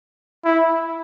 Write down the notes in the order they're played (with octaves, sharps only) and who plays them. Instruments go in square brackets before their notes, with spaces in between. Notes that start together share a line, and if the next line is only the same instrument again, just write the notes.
[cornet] E4